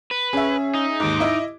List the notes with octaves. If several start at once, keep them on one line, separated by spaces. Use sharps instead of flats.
B4
C#4 G#4 E5
D#4
D#2 G#2 D6
E4 D#5